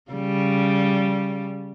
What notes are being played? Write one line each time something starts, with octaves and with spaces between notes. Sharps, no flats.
C#3 G3